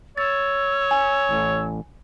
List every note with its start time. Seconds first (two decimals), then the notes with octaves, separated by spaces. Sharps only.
0.17 C#5 E6 A6
0.91 G#5
1.29 A1